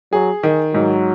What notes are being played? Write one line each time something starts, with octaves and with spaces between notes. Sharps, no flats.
F#3 G#4
D#3
G#2 F#3